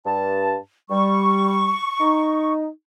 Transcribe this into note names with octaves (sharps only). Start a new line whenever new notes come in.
G2 A5
G3 C#6
D#4